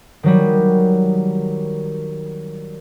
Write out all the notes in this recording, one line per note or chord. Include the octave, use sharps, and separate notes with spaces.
D#3 F#3 G3